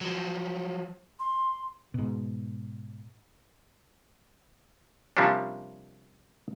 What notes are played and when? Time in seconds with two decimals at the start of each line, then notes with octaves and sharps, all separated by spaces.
0.01 F3 F#3
1.20 C6
1.94 G#2 B2
5.17 C3 F3 G3 A#3 C#4 D4